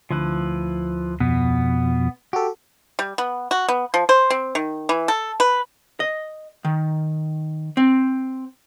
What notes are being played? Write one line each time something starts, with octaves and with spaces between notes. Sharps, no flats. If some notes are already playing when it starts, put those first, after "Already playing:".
D2 F3 E4 B4
F2 B2 B3
F#4 G4 A4
G3
B3
F#4
B3
F3
C5
C4
D#3
E3
A4
B4
D#5
D#3
C4